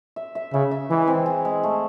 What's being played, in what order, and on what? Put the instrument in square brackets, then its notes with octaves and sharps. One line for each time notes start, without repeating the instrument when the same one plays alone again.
[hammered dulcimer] E5
E5
[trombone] C#3 [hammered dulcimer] E5
[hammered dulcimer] E5
[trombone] E3 [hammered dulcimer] G#3
[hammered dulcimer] C4
G#3
G#3
A3